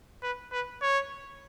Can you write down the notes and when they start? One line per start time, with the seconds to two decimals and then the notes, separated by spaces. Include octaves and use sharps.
0.23 B4
0.52 B4
0.82 C#5